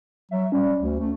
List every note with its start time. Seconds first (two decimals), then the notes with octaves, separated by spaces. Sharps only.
0.31 F#3 E5
0.52 G3 C#4
0.79 D2
1.00 A3